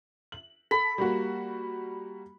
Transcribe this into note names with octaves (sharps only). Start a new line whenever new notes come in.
F#7
A4 B5
G3 A#3 F#4